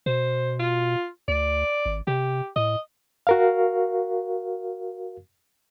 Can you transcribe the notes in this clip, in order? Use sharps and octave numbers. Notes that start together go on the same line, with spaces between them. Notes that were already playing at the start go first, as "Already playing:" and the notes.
B2 C5
F4
D2 D5
G#1
C3 G4
A2 D#5
F#4 A#4 F5